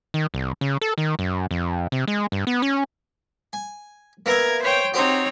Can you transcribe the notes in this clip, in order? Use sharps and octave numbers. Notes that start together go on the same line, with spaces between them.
D#3
C2
C#3
A4
D#3
F#2
F2
C3
G#3
G2
B3
C#4
G#5
A#3 B3 A#4 E5 G#6
C5 C#5 G5
C4 D#4 F#4 G4 C5 C#5